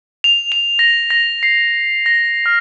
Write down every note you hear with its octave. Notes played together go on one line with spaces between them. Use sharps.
F7
F7
A#6
A#6
C7
A#6
F6